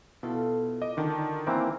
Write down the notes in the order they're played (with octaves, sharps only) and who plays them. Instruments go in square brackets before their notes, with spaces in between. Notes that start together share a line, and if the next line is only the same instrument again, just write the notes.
[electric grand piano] B2 [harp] E4 F4 A4
[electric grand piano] D#5 [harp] D6
[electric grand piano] D3 D#3 [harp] D5 A5
[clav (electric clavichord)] E3 A#3 C4 [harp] A#5 D6